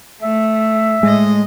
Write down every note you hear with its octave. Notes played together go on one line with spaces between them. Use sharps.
A3 E5
A2 G#3 D#5